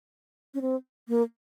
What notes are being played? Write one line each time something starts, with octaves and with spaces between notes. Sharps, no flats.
C#4
C4
A#3